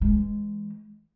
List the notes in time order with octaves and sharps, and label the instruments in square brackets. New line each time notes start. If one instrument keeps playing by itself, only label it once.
[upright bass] E3 G#3